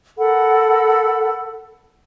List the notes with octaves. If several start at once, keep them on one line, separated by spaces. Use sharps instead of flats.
A4 A#4 F#5 B5